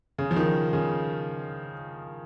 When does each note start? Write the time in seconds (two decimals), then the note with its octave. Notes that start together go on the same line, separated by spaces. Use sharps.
0.18 C#3
0.31 F3
0.36 D#3
0.73 C#3